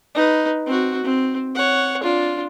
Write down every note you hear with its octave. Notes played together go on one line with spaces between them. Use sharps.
D#4 B4
C4 F#4
C4
C#5 F#5
D4 F4